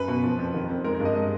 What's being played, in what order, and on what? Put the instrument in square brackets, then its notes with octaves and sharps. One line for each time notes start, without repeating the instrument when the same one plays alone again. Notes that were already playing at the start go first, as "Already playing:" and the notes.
Already playing: [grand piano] F#2 B4
B2
F3
F2
D#3
F2
G#3 A#4
A#4
G2
D#5
G#3 D#5